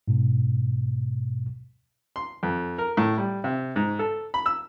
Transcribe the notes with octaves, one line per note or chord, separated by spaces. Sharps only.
G#2 B2
C6
F2
A#4
A2
G3
C3
G#2
A4
B5
E6